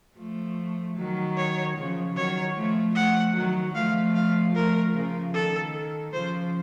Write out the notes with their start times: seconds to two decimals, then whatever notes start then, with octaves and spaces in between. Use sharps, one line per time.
0.18 F3 A3
0.97 D#3 F#3
1.37 C#5
1.77 C#3 F3
2.16 D#3 F#3 C#5
2.57 F3 A3
2.95 F3 A3 F#5
3.36 D#3 F#3
3.75 F3 A3 F5
4.15 F5
4.55 F3 A3 A#4
4.95 C#3 F3
5.34 D#3 A4
6.13 C#3 F3 C5